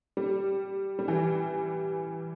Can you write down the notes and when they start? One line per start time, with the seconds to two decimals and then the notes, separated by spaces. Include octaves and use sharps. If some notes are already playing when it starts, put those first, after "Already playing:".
0.17 G3
0.99 G3
1.08 E3